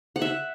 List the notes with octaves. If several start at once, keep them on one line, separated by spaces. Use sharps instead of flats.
F#5
E5